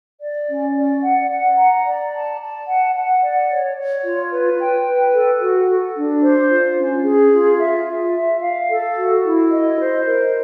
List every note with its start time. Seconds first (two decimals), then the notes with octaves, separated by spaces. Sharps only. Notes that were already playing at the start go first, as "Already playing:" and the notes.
0.21 D5
0.49 C#4
0.76 D5
1.03 F#5
1.31 F#5
1.58 A#5
1.85 D5
2.13 A5
2.40 A5
2.68 F#5
2.95 F#5
3.22 D5
3.50 C#5
3.77 C#5
4.04 F4
4.31 B4
4.59 G5
4.86 B4
5.14 A4
5.41 F#4
5.68 A4
5.95 D4
6.23 C5
6.51 F4
6.78 C#4
7.05 G#4
7.32 F4
7.60 E5
7.87 F4
8.15 E5
8.42 F5
8.69 A4
8.97 F#4
9.24 E4
9.52 D#5
9.78 C5
10.06 A#4